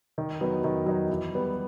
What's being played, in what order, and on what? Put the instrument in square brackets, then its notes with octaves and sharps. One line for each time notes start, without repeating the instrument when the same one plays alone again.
[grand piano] D#3
F#3 B3 D#4
D#3
F#3 B3 D#4
E3
G3 B3